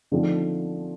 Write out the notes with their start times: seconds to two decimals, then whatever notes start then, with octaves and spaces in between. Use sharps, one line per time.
0.12 D3 F3 A3 C4 D#4